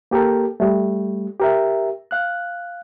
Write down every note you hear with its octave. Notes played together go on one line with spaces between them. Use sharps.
A#3 G4 A4 A#4
G3 A3
G4 A#4 E5
F5 F#6